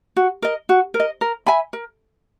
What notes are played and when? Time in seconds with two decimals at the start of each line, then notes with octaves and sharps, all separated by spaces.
0.16 F#4
0.42 A#4 D#5
0.69 F#4
0.94 A#4
1.00 D#5
1.21 A#4
1.46 E5 G#5 B5
1.73 A#4